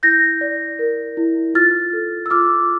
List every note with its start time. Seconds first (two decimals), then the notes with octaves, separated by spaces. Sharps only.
0.03 E4 G6 A#6
0.41 D5
0.79 A#4
1.17 E4
1.54 F4 F6 A6
1.93 A4
2.26 E6
2.30 F4 D6 F6